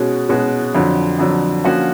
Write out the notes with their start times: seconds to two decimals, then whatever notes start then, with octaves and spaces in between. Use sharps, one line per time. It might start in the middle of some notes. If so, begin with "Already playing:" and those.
Already playing: B2 G#3 C#4 F#4
0.29 B2 G#3 C#4 F#4
0.75 F2 D3 F#3
1.19 F2 D3 F#3
1.64 D3 F3 A#3 C#4 F#4